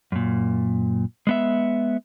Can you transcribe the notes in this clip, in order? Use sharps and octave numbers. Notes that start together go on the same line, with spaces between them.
F#2 A#2
G#3 B3 E5